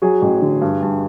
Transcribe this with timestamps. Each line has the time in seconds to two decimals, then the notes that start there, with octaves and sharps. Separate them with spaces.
0.02 F#3 F#4 G#4
0.22 A1
0.42 D3
0.61 G2
0.82 G2